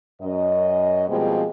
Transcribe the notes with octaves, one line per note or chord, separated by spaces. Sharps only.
F#2 D#5
B2 F3 G3 G#3 A#3 C4